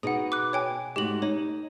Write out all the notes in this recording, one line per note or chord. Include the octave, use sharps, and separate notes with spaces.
B2 D#4 G#4 F#5
D6 F#6
C#5 G5 G#5
G#2 A3 F#4 G4 F#7
D#4 C#5